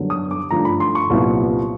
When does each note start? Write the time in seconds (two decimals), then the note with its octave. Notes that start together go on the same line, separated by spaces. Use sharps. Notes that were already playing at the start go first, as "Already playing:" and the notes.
Already playing: F#2 D3 G3 B3
0.10 D#6
0.31 D6
0.50 G2 D3 F3 A3 D4 A#5
0.65 B5
0.80 C6
0.95 C#6
1.10 C2 A#2 F#3 B3 E4